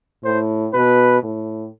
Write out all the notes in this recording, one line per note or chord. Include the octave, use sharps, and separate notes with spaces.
A2 C5
B2 B4
A2